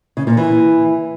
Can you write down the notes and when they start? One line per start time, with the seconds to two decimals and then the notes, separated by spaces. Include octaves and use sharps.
0.17 C#3
0.27 A#2
0.37 E3